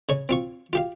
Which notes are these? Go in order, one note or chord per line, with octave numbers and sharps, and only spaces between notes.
C#3 C#5
C4 F4 C#6
F4 G4 F5